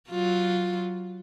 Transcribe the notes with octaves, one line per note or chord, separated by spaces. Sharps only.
F#3 F4